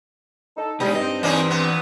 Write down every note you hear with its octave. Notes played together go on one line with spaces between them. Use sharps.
D#4 A4
B2 G3 G#3 D#4
G2 C4 D#5
E3 A#3 C#4 D#4 D5
A#2 B3